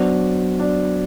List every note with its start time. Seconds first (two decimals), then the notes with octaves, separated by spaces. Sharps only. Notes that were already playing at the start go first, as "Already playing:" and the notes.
Already playing: F#3 B3 D4 F#4 C5
0.59 D4